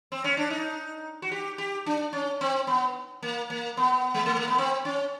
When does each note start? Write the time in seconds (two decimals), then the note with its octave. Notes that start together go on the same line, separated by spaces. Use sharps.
0.12 C4
0.24 C#4
0.37 D4
0.50 D#4
1.22 F#4
1.31 G4
1.58 G4
1.86 D4
2.13 C#4
2.41 C4
2.67 B3
3.23 A#3
3.50 A#3
3.77 B3
4.14 G#3
4.26 A3
4.36 A#3
4.48 B3
4.58 C4
4.85 C#4